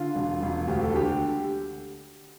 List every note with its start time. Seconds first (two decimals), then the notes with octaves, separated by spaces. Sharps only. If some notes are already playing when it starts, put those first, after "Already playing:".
Already playing: D3 F4
0.15 E1
0.42 E1
0.68 D2 G4
0.82 A4
0.94 D3 G4